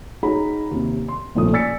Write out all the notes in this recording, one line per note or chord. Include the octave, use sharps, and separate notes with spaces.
D#4 F#4 G#4 C#5 A#5 B5
D#2 C3
C6
F#1 B1 A#2 F3 A3 D#6
D5 G#5 E6 A6 B6 C#7